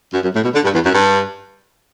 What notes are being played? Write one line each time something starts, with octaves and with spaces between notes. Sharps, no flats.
F#2
F#2
A2
B2
D3
G2
E2
F#2
G2